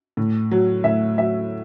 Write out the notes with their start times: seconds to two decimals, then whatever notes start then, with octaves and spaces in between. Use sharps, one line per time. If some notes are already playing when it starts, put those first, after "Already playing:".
0.17 A2
0.51 F#3
0.84 A2 E5
1.18 F#3 E5